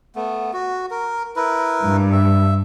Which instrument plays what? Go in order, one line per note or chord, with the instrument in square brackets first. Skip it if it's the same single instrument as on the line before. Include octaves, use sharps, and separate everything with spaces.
[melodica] A3 B3
F#4
A#4
E4 A#4 B4
[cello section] G2
[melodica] E5